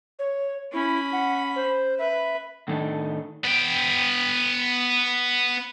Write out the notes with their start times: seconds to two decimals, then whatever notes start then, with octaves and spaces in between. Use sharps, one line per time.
0.19 C#5
0.73 C#4 E4 B5
1.13 F#5
1.56 C5
1.99 B4 E5
2.68 A2 D#3 A3 D4 D#4
3.45 B3 G5